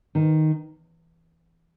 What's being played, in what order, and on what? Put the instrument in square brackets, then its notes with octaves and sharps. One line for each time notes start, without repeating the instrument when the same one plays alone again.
[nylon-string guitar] D#3